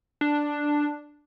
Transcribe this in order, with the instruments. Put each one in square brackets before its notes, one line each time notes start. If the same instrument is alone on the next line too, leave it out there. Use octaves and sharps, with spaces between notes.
[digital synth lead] D4